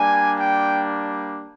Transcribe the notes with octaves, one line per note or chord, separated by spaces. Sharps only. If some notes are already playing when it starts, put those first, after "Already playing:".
Already playing: G3 A#3 D4 G#5
G5